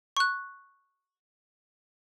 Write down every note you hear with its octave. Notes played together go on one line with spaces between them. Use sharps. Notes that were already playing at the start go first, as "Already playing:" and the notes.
C#6 F#6